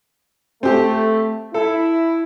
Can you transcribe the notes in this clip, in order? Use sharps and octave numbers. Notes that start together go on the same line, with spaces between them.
A3 C4 G4
E4 A4